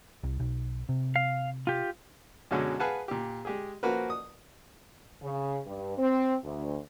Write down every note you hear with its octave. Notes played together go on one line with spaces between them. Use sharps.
C2
B1
C3
F5
F4 G4
F#2 B2 D3 F#3 G#3
G#4 B4 F5 F#5 G#5 A5
A#2 G4
G#3 G4 G#4
F3 A#3 F#4 A#4 B4
D#6
C#3
G2
C4
D2